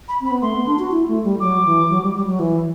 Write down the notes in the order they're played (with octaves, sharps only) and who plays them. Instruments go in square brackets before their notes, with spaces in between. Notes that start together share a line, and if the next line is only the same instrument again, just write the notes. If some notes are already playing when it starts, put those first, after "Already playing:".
[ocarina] B5
[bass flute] C4 [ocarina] B5
[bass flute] B3
[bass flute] A3 [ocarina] C6
[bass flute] B3
D4
F#4
E4
A3
G3
[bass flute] F#3 [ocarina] D6
[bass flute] E3
F#3
G3
G3
F#3
E3